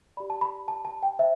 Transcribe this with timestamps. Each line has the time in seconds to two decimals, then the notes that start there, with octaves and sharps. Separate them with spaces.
0.17 G4 D5 B5
0.30 A5
0.41 B5
0.68 A5
0.85 A5
1.03 G5
1.19 C5 E5